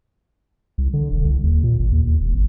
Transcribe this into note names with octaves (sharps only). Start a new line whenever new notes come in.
C2
D3
E1
C2
D#2
A#2
G#1
D#2
D#2
E1
G#1